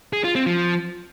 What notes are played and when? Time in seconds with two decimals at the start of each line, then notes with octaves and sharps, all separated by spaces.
0.13 G#4
0.24 F4
0.35 C4
0.46 F3